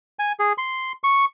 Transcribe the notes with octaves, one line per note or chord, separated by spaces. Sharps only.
G#5
G#4
C6
C#6